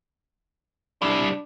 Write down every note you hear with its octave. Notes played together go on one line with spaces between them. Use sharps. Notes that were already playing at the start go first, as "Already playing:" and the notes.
G3 D4 E4